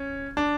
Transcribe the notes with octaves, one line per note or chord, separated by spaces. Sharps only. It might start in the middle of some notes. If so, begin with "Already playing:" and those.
Already playing: C#4
D4